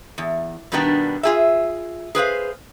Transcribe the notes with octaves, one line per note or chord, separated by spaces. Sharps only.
E2
G2 B2 D#3 G3 B3 D4
F4 G#4 E5
G#4 B4 C5 F5